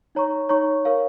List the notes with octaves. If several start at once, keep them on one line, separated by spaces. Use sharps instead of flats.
D#4 C#5 A#5 C#6
D#4 C#5 A#5 C#6
A#4 C#5 F5